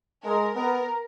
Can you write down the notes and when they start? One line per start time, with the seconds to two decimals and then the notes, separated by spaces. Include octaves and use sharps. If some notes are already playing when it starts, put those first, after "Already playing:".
0.24 G#3 A#4
0.55 B3 A#4